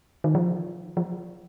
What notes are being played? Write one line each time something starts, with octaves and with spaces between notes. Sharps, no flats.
D#3
F3
F3